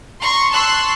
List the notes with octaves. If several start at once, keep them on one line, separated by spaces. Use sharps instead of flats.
A#5 C6 C#6
A5 C6 C#6 E6 F#6